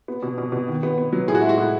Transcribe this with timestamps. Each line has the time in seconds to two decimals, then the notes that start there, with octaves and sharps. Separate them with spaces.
0.08 B3
0.23 B2
0.38 B2
0.52 B2
0.68 D#3
0.83 B3
0.98 B3
1.13 F#3
1.28 A2 G#4
1.35 F#4
1.42 G#3 E4
1.49 F#4
1.58 A2